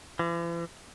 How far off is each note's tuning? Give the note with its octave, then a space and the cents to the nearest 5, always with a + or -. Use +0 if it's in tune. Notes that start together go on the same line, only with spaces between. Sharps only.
E3 +45